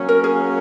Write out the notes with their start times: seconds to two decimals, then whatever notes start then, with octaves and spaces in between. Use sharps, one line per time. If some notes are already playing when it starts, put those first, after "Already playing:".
Already playing: F#3 A#3 C#4
0.09 A#4
0.24 G#4